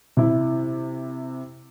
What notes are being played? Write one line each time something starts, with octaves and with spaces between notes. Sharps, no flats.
C3 E4